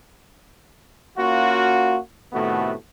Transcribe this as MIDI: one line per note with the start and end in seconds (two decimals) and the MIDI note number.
1.18 1.98 58
1.18 1.98 61
1.18 1.98 65
1.18 1.98 66
2.33 2.74 45
2.33 2.74 48
2.33 2.74 51
2.33 2.74 57
2.33 2.74 59
2.33 2.74 66